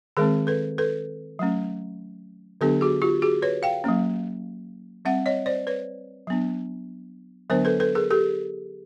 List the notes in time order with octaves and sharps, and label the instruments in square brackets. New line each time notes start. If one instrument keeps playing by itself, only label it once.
[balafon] D#3 G#3 C4 G#4 A#4
A4 B4
A4 B4
F#3 A3 C#4
D3 F#3 B3 D4 G4 A4
F#4 G#4
F4 G4
F#4 G#4
B4 C#5
F5 G5
F#3 A#3 C#4
G3 C4 E5 F#5
C#5 D#5
C5 D5
B4 C#5
F#3 B3 D4
D3 F#3 B3 D4 A#4 C5
A4 B4
A4 B4
G#4 A#4
G4 A4